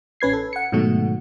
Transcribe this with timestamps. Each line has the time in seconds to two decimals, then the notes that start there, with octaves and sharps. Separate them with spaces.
0.21 A1 C#4 B4 G#6 C7
0.33 A4
0.53 F#5 C#7
0.72 G#2 B2 D#3 F#3 A3 F#4